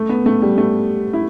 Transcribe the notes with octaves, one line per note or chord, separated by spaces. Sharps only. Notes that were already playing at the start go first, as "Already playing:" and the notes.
Already playing: A3
B3
A3
G3
A3
E4